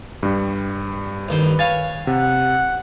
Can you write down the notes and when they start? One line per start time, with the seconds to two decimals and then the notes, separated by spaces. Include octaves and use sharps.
0.23 G2 G3
1.28 A1 D#3 B4 C5
1.59 C#5 F5 G#5 A6
2.07 C3 F#5